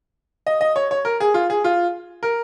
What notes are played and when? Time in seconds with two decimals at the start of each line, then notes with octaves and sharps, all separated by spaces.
0.47 D#5
0.61 D#5
0.76 C#5
0.91 C#5
1.05 A#4
1.20 G#4
1.34 F4
1.50 G#4
1.64 F4
2.23 A#4